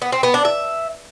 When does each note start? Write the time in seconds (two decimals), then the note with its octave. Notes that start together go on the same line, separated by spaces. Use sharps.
0.02 B3
0.12 C4
0.23 B3
0.34 D4
0.45 E5